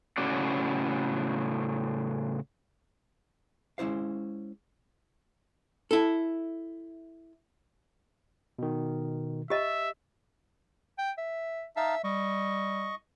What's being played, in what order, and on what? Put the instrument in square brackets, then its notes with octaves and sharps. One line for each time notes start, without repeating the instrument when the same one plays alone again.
[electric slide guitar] A2 C#3 C#4 F#4 D5
[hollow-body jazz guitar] G#3 C#4 E4 C5 F5
E4 A4
[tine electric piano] B2 D#3
[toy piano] G4 D#5 [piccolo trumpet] E5
[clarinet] G5
E5
[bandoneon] D#4 F5 A5 [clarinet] E5
[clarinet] G3 [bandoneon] D#5 C#6